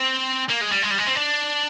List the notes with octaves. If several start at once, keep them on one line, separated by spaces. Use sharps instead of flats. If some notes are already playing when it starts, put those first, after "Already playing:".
Already playing: C4
A#3
G#3
G3
G#3
G3
G#3
C4
D4